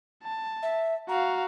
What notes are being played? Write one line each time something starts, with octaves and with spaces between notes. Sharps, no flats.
A5
E5
F#4 F5 A#5